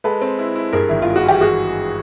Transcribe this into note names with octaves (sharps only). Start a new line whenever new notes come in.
G#3 A4 B4
C4
E4
E4
G2 G#4 A#4
G#1 E4
F4
G#3
F#4
E3 G4
F#4 G#4